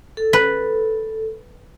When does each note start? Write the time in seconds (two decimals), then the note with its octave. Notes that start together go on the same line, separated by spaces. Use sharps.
0.17 A4
0.33 B4